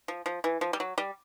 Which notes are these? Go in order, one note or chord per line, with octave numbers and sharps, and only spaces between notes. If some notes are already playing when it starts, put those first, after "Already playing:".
F3
F3
E3
F3
G3
F#3
G3